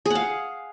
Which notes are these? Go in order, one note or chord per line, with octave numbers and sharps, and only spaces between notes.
G#4 F5 F#5